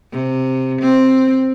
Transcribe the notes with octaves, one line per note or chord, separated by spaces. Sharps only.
C3
C4